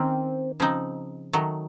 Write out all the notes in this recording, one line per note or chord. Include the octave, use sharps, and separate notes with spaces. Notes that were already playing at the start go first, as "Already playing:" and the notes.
Already playing: D#3 A#3 C4 C#4
C#3 F3 C4 D#4
D#3 F#3 A3